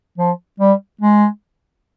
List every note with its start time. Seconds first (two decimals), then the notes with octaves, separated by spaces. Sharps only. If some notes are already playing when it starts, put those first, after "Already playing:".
0.18 F3
0.60 G3
1.01 G#3